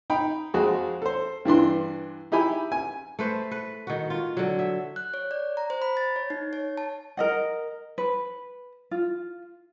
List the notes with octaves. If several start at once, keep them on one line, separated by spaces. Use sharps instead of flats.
D#4 G5 B5
F2 G#3 F#4 G#4
A4 C5
G2 E3 D4 C6
D#4 E4 G4 G#5 B5
G#5
A3 B4 C5
B4
D#3 F#4
F4
D3 F#3
E5
F#6
C#5
D5
A#5
C5
B5
A6
C#5
D#4
C#5
A5
A#4 D#5 F#5
B4
F4